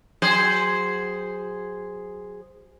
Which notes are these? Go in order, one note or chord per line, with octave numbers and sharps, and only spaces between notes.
F#3 G#4 C5